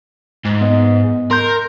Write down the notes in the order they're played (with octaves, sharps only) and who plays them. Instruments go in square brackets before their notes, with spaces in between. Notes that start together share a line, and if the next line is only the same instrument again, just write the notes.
[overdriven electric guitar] G#2
[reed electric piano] B3 D#5
[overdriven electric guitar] A#4 [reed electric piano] C6 G6